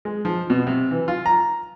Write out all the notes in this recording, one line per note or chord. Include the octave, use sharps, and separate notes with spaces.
G#3
F3
B2
C3
E3
F4
A#5